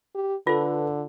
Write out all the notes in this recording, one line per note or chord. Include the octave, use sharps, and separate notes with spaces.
G4
D3 F4 A4 B4